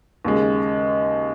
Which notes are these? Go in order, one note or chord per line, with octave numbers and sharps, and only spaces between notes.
D#2 C#3 G#3